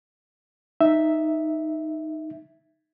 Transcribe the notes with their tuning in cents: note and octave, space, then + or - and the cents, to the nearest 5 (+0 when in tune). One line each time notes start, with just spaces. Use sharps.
D#4 +0 E5 +0